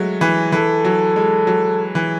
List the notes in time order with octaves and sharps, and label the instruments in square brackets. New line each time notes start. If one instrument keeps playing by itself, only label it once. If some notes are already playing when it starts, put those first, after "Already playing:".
Already playing: [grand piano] F#3 G#3 A3
E3
[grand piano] E3 [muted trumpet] A4
[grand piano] F#3
G#3
F#3
E3